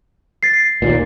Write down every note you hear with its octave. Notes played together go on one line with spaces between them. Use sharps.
A6 C7
D#2 A#2